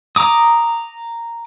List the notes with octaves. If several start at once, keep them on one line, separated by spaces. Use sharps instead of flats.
A#5 D6 D#6